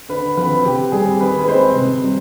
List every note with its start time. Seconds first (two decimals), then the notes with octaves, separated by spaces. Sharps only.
0.09 D3 B4
0.37 F3 C4 B4
0.65 C3 G4
0.92 G3 C4 G#4
1.20 D#3 B4
1.41 B4
1.48 G#3 C4 C5
1.75 C3
2.03 G3 C4